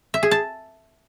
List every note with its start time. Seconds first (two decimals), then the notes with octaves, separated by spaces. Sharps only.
0.14 E5
0.23 G#4
0.31 A5